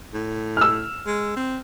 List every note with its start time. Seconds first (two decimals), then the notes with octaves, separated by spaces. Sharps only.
0.13 A2
0.57 E6 F6
1.06 G#3
1.36 C4